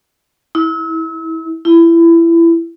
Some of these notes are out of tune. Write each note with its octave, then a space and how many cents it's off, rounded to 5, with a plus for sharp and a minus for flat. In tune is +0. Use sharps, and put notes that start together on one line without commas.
E4 -35
E4 +20